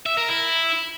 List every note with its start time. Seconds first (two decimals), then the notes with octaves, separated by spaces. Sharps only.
0.06 E5
0.17 A#4
0.29 E4